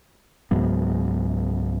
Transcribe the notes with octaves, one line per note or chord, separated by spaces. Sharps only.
C#2 G#2 F#3 B3